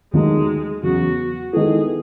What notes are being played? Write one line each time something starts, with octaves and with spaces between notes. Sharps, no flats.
D#2 D#3 F#3 G#3 A3 D#4
E2 C#3 F#3 F#4
D#3 G#3 B3 E4 G#4 A4